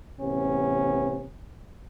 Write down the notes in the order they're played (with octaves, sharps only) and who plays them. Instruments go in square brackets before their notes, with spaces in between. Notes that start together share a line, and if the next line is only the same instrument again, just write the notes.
[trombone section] A1 C3 B3 C#4